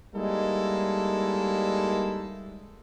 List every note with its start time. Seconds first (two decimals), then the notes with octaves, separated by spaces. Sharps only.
0.15 G3 G#3 A#3 D#4 E4 A4